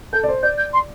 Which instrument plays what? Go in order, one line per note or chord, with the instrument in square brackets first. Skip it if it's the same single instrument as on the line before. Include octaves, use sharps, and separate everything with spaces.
[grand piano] A4 [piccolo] G6
[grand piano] D5
C5
[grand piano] D5 [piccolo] G6
[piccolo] G6
C6